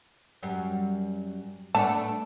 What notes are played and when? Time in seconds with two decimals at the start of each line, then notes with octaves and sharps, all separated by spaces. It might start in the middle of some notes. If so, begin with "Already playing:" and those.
0.43 F#2 G3
1.75 A3 B3 D4 A5